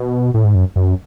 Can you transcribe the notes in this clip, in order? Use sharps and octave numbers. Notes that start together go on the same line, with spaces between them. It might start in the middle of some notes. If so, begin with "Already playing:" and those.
Already playing: B2
A2
G#2
F#2
F#2